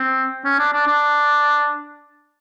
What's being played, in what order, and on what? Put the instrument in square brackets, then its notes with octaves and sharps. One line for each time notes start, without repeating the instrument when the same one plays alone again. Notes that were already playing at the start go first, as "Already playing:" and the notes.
Already playing: [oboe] C4
C#4
D4
D4
D4